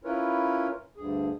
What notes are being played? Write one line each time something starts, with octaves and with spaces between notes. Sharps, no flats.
C#4 E4 F4 A#4 B4 C#5
D2 G2 G#4